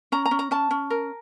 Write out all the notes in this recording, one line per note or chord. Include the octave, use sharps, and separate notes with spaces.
C#4 A#5
A#5
C#4
A#5
C#4 A5
C#4
A#4